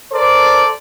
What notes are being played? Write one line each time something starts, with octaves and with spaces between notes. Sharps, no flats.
A4 A#4 C5 D5